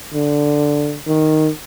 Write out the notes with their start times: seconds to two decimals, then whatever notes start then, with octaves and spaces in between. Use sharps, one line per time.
0.14 D3
1.07 D#3